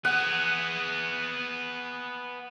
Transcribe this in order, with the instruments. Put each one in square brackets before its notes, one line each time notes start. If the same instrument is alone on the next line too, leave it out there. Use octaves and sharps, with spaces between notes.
[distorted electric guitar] B3 G#4 [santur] F#5